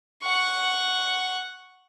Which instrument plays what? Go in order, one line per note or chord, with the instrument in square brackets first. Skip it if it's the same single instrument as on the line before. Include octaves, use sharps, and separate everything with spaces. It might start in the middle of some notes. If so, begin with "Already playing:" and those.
[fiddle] F#5 C#6